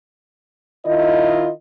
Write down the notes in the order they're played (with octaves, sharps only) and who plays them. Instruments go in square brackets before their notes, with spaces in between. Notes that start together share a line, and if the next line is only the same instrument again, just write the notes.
[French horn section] D#3 E4 F4 D#5